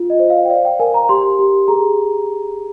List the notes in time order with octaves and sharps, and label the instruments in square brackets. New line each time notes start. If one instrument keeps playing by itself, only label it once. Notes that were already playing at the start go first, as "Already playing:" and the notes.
Already playing: [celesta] F4
D#5
C5
F5
G5
D5 F5
G5
A#4 G#5
A#5
G4 C6
G4
G#4 A#5